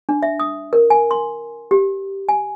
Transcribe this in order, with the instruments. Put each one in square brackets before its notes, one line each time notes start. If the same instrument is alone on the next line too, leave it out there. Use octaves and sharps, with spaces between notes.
[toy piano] D4
E5
D#6
A#4
G#5
C6
G4
G#5